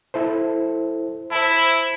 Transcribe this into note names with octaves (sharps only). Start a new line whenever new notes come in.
E4 A4 C5
E4 C5 A5